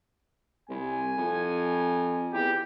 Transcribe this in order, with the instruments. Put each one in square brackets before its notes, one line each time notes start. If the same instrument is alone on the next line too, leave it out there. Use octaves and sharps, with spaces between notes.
[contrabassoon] C2 [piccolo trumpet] G#5
[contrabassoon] F2
[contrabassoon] E2 [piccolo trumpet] G4